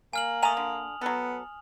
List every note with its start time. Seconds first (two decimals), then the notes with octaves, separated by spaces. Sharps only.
0.13 A#3 G#5 F6 F#7
0.43 A3 G#5 A#5 D#6 F7
0.57 D3
1.01 F#3 B3 A4